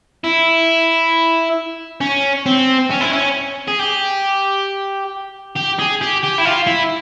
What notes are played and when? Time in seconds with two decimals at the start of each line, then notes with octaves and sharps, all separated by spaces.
0.24 E4
2.01 C#4
2.46 C4
2.91 C#4
3.01 E4
3.13 C#4
3.68 G#4
3.79 G4
5.56 G4
5.79 G#4
6.01 G4
6.23 G4
6.38 E4
6.45 F4
6.67 E4